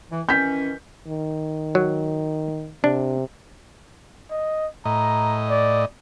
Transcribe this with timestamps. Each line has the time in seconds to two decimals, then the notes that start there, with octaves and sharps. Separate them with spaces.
0.11 E3
0.29 D#3 E3 C#4 G6 B6
1.07 D#3
1.75 F#3
2.84 C3 D4
4.31 D#5
4.85 A2 D#5 A#5
5.50 D5